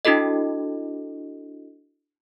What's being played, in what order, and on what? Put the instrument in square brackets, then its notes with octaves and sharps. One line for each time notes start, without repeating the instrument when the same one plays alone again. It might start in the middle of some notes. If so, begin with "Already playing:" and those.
[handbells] D4 E4 F#4 A4 D#5